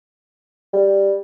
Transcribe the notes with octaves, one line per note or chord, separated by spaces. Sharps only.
G3